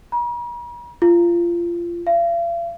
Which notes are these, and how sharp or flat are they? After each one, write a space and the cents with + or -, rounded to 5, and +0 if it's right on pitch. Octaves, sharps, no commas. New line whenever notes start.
A#5 +45
F4 -25
F5 -45